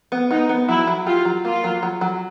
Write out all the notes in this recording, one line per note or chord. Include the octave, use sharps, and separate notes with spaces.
B3
B3 D#4
B3
F#3 E4
F#3
F4 G4
F#3
A#3 F4
F#3
F#3
F#3